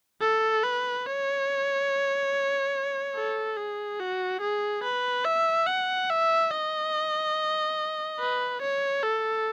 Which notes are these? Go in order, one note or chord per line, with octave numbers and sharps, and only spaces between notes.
A4
B4
C#5
A4
G#4
F#4
G#4
B4
E5
F#5
E5
D#5
B4
C#5
A4